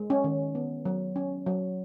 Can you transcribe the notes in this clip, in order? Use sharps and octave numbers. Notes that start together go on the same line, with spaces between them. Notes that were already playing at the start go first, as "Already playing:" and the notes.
Already playing: G#3
C#4
D#3
B3
F#3
C#4
F#3